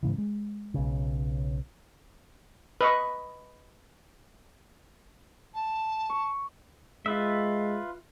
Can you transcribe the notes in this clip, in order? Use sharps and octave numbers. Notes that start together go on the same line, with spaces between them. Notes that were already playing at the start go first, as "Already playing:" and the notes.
G#2 C#3 E3
G#3
B1 C#3
B4 D#5 C#6
A5
C#6
G#3 F4 B4 E5